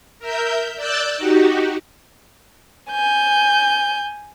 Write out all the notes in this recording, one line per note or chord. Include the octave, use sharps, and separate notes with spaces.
A#4 E5 G6
D5 E6 F#6 G6 A6
D#4 F#4 G4
G#5 G6